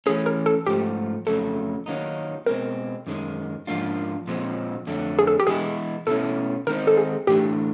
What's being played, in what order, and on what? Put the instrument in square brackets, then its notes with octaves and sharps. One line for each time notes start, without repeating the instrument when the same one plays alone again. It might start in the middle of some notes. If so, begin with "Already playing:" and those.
[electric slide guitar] E3 A3 C#4 [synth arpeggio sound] G#4
[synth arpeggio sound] A#4
A4
[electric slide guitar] G#2 F3 A3 [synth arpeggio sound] G4
[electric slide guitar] F2 C#3 F#3 A3 [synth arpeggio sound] A4
[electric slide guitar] D#3 F#3 A#3 D#4
[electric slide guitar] B2 G#3 C4 [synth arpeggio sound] A#4
[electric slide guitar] F#2 D#3 G#3
G#2 F3 A#3 D4 F4
A#2 F3 G#3 C4
F2 D3 F#3 A3
[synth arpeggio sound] G#4
A4
G4
[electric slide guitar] E3 G#3 B3 E4 [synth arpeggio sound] G#4
[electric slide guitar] B2 F#3 A3 C#4 E4 [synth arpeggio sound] A4
[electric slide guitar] D#3 G#3 C4 D#4 [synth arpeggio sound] A#4
[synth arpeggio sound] A4
G#4
[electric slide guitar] A2 E3 A3 D4 [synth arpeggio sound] G4